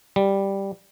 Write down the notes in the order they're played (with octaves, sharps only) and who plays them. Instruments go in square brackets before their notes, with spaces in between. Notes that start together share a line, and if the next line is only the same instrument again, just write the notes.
[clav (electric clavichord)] G3